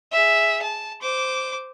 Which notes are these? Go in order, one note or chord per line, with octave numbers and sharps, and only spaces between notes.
G#4 E5
A5
C5 D6